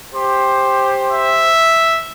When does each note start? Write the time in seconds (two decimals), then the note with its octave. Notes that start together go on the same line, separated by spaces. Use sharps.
0.13 G4 C5
1.12 E5